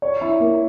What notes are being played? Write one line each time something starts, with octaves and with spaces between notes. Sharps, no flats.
C#5
E4
A#3